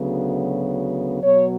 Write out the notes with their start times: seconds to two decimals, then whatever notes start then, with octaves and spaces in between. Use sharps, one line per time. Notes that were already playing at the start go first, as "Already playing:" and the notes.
Already playing: D2 C#3 F#3 B3
1.22 B2 F#3 B3 C#5